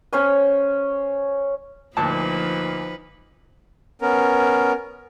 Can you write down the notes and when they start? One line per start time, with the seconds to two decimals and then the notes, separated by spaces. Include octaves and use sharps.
0.13 C#4 C5 C#5 G#5
1.97 D2 A#2 F3 D#4 B4 A5
4.02 B3 C#4 A#4